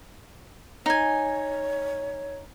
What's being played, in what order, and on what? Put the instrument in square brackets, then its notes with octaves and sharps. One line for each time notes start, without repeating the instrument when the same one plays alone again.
[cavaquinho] D#4 G#5 [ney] C#5